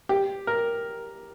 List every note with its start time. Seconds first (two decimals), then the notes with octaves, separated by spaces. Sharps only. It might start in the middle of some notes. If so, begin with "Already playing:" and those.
0.09 G4
0.47 A#4